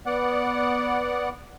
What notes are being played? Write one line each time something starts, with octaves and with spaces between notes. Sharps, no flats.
B3 D5 F#5